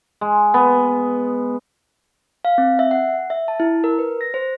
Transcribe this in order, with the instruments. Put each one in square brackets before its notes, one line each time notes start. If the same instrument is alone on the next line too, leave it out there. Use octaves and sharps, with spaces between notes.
[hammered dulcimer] G#3
B3
[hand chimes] F5
C4
E5
F#5
E5
A5
E4
A#4
B4
A#6
C5